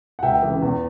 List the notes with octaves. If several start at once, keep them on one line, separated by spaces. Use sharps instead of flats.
F#5
C#2 E5 G5
C#3 E3
E2